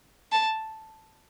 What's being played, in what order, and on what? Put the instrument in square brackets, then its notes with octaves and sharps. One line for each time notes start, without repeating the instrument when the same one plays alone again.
[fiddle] A5